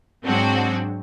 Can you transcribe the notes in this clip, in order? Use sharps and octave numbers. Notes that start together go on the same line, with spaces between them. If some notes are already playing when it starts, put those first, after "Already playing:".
G#2 F#3 G#3 C4 D4 F#4